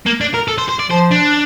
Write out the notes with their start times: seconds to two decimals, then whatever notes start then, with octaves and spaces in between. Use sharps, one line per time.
0.06 A#3
0.21 D4
0.34 A#4
0.48 A4
0.58 C5
0.69 C5
0.79 D5
0.90 F3 C5
1.11 D4